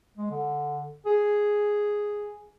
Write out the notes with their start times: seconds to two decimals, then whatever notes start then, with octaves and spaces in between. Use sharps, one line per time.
0.17 G#3
0.30 D3
1.06 G#4